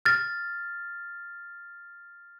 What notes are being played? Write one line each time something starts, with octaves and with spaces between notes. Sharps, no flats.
F6 A6